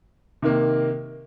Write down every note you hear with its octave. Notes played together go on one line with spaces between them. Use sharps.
C3 D#3 A#3